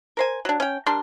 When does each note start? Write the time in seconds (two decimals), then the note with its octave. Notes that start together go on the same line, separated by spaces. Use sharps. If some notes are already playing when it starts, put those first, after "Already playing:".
0.17 A#4 C5 G#5
0.45 F#3 D4
0.60 C#4 G5
0.86 G3 D4 A#4 C6